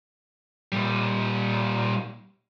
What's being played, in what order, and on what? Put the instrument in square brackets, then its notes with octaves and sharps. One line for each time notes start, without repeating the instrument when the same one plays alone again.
[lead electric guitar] A#2 G3